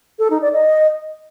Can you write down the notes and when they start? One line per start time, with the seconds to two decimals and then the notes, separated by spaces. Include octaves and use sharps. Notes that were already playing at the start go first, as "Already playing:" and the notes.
0.19 A4
0.30 D#4
0.42 D5
0.53 D#5